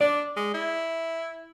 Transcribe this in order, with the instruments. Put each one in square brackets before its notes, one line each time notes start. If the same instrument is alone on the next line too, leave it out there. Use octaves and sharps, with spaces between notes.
[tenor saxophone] D4 [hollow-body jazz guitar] D5
[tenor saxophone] G#3
E4